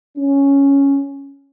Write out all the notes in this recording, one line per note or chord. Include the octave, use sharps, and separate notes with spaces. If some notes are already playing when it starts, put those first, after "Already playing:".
C#4